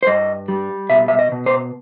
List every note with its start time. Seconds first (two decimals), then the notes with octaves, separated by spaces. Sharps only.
0.03 C5
0.07 G2 D#5
0.48 G3
0.90 B2 E5
1.08 E5
1.19 D#5
1.32 B2
1.46 C5